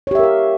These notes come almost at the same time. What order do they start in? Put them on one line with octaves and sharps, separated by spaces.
C#5 G4 E5 A#4 F5